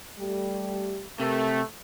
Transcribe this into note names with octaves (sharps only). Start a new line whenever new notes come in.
G3 A3 G4
C3 A3 G4 A#4